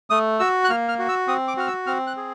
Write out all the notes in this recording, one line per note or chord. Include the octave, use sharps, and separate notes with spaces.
A3 D#6
F#4 E6
F#6
A#3 F6
F6
F#4
E6
C4 D#6
D6
F#4 F6
E6
C4 F6
F#6
G#4